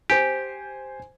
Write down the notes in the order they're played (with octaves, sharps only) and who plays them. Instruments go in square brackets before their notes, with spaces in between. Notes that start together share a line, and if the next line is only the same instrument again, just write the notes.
[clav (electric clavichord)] G4 [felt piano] C5 G#5